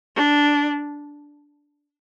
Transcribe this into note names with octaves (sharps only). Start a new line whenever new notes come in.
D4